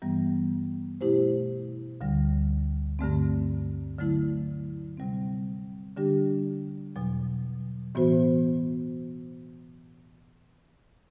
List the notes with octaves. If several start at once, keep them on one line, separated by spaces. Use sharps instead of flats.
G2 E3 G3 B3
B2 A3 E4 G4 C5
D2 D3 G3
G2 D3 A3 C4
D3 F#3 A3 E4
C3 G3 C4
D3 G3 D4 G4
E2 B2 F#3
A2 E3 B3 F#4 C5